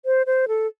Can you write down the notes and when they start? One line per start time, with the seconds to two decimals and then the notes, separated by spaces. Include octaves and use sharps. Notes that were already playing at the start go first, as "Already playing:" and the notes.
0.05 C5
0.26 C5
0.48 A4